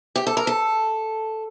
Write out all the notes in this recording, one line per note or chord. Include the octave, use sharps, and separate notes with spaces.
G4
A4
A#4
A4